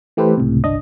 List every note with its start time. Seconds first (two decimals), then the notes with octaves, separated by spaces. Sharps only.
0.17 E3 A3 G4 A4 B4 C5
0.38 C#2 A2 C3
0.64 G1 C2 D4 D#5